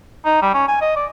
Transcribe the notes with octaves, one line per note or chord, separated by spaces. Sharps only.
D#4
G3
C#4
G#5
D#5
D5